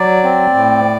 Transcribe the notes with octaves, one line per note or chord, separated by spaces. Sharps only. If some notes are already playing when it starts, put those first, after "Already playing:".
Already playing: F#3 D5
C4
A2